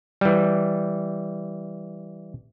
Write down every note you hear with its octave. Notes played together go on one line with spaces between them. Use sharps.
E3 G3